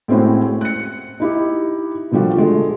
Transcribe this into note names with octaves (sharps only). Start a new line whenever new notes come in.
A2 G#3 C4 C#4 E4 F#4
F#6 C#7
D#4 E4 G4
A#2 D3 F3 G3 F#4
D3 G#3 A3